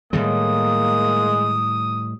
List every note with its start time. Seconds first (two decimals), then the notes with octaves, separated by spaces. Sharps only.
0.13 A2 D#3 G3 G#3 A#3 D#6